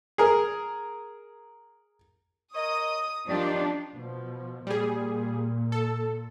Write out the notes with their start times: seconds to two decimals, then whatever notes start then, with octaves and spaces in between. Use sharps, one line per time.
0.18 G#4 A#4
2.54 A#4 C#5 D#5 D#6
3.29 D#3 F3 D4 G4 D5
3.96 B2 F3
4.67 A#2 G3 G#4
5.72 A4